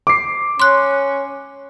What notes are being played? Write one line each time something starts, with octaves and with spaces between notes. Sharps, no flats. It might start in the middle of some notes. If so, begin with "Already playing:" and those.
D6 C7
C#4 C6 F#6